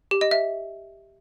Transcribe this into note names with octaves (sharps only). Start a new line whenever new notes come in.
G4
D#5
E5